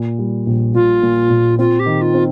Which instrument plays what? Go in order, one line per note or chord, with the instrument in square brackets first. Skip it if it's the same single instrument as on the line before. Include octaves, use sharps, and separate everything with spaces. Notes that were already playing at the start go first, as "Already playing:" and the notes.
Already playing: [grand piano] A#2
G3
A#1
[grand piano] A#2 [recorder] F4
[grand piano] A#2
A#2
[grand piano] C4 [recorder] F4
[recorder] G4
[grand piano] D#3
[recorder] F4
[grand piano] C4